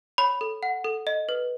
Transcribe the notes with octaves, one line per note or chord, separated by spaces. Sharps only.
C#5 B5
A4
F#5
A4
D#5
B4